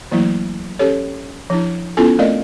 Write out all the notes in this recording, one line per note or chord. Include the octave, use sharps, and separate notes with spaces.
E3 F#3 A3 A#3 E4
C#4 G4 A4 C#5
F3 D4 E4
B3 C#4 E4 F4 A4 G#5
A3 C4 A#4 D5 D#5 F5